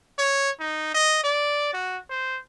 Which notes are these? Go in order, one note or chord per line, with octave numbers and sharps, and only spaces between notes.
C#5
D#4
D#5
D5
F#4
C5